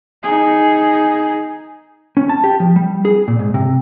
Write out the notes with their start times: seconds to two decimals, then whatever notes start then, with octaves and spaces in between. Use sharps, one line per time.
0.23 D#4 G#4
2.17 C#4
2.29 A5
2.44 G4
2.60 F3
2.76 G3
3.05 G#4
3.28 A#2
3.39 G#2
3.54 C3